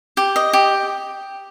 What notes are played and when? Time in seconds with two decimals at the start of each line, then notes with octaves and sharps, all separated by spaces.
0.17 G4
0.36 D#5
0.53 G4